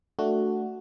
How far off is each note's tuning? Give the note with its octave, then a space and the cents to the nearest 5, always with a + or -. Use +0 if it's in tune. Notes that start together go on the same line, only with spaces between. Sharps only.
A3 +0 D4 +0 F#4 +0